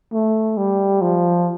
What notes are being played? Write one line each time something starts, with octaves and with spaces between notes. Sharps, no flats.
A3
G3
F3